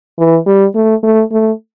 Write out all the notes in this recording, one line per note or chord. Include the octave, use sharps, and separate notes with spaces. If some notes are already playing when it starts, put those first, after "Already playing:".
E3
G3
A3
A3
A3